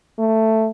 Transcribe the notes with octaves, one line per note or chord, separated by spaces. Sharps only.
A3